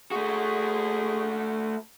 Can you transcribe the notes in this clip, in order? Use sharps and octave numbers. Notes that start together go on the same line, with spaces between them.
A3 F#4 G#4